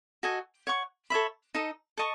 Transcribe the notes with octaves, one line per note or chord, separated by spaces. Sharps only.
F#4 A4 D#5 G#5
C#5 F#5 C#6
A4 C#5 E5 B5
D#4 A4 D#5
A4 D#5 A5 C#6